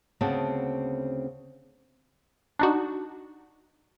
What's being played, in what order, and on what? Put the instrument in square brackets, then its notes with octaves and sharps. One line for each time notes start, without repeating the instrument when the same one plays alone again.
[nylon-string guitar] D2 C#3 B3 C4 F#5 A5
[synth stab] D4 D#4 F#4